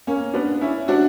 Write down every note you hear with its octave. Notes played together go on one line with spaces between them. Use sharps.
A#3 C#4
B3 D4
C#4 E4
D4 F#4